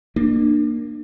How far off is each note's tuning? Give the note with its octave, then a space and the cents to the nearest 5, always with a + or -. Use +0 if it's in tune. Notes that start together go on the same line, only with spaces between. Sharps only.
A#3 +0 D4 +25